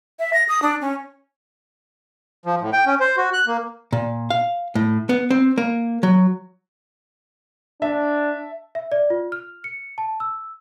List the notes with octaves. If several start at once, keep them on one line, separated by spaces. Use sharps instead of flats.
E5
A#6
D#6
D4
C#4
F3
A2
G5
C#4
C5
F#4
F#6
A#3
A#2
F5
A2
B3
C4
A#3
F#3
D4 E5 A5
E5
D5
F4
F6
C#7
A5
E6